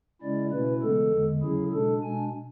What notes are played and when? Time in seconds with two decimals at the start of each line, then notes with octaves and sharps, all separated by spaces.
0.21 C#3 G#3 C#4 E4 D5
0.52 B2 A3 C#4 E4 B4
0.82 C#3 E3 G#3 B3 A4
1.13 E2 D3 G#3
1.42 C#3 F#3 C#4 E4 G#4
1.73 B2 G#3 D4 A4
2.02 B2 G#3 D4 G#5